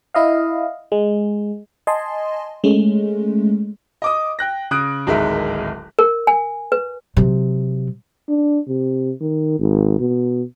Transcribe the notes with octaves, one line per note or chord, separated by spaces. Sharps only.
E4 D#5 F5
G#3
D#5 G#5 A5 C6
G#3 A3 C#4
D#5 D6 D#6
G5 F#6 A#6
C#3 D#6 F#6 D7
D1 G#1 G#3 D#4 A#4 E5
A#4
G#5
B4
C3 F#3
D4
C3
D#3
G#1
B2